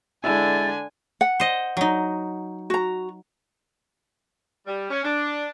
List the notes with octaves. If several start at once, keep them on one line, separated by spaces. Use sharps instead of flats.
D3 G#3 E4 G#5 A6
F#5
C5 D#5
F#3 D#4
F#4 A#5
G3
C#4
D4